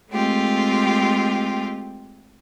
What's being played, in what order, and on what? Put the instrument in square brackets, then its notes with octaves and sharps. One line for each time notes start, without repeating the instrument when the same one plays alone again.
[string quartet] G#3 A3 C4 F4 G4